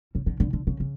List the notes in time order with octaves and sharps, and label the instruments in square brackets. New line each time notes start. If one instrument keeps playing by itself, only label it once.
[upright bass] C#3
D3
D3
D3
C#3
C#3